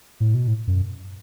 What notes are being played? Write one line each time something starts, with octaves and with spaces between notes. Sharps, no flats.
A2
B2
A2
F#2